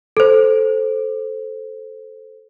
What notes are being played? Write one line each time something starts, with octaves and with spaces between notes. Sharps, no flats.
A4 C5